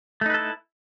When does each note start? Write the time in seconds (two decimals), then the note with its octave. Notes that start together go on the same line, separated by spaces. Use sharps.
0.21 A3
0.26 D#4
0.30 B4
0.34 A4
0.38 E4